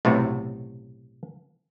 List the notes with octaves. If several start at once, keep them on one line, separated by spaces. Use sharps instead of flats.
B1 A2 C3 A3 F#4